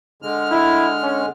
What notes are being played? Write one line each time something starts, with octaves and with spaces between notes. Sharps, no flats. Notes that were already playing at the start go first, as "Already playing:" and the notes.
D3 G#3 F6
E4
C#4